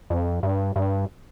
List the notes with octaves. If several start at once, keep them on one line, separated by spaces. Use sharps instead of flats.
F2
G2
G2